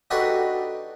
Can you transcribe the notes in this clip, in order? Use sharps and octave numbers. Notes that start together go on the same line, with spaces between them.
D4 D#4 F#4 G4 A4 B4